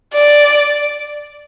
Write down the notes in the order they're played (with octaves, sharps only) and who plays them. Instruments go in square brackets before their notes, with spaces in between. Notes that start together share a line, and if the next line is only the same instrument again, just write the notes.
[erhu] D5